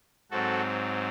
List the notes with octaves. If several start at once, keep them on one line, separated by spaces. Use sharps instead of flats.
G#2 F#3 C4 F#4 A4